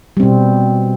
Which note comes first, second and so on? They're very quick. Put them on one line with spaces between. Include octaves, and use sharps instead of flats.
G3 C4 B2